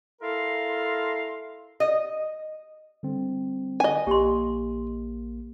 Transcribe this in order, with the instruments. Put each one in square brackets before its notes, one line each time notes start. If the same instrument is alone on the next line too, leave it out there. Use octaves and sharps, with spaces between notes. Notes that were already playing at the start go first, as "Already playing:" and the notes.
[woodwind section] E4 A4 A#4 F5 C6
[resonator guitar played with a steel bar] D#5
[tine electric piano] D3 G3 C4
[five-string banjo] D#5 G#5 [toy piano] F5
[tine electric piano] A#1 A#3 [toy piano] G4 C6